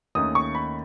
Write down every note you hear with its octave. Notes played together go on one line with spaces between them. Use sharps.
D#2 D#3 A3 C#4 D#6
C#6
B5